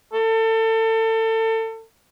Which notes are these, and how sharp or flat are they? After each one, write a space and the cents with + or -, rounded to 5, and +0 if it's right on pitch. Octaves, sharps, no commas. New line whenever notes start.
A4 +30